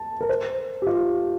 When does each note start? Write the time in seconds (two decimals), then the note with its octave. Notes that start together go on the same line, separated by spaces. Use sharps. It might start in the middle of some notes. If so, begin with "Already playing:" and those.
Already playing: A5
0.21 A#4
0.29 C5
0.82 G4
0.87 F4